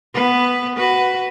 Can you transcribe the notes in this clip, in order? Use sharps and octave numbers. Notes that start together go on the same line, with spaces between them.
B3 B4
F#4 B4